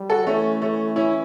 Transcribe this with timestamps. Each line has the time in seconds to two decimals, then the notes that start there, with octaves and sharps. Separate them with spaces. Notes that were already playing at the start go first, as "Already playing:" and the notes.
Already playing: G3
0.10 F#4 A4
0.27 E3 A3 C#4
0.62 A3 C#4
0.96 C#4 E4